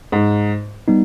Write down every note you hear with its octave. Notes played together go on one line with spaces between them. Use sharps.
G#2
G3 B3 D#4